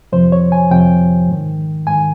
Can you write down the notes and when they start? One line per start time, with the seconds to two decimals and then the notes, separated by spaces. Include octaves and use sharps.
0.12 F2 C3 F3 C5
0.32 C#5
0.52 G#5
0.71 F2 C3 F3 G5
1.28 G#2 D#3
1.87 G#2 D#3 G#5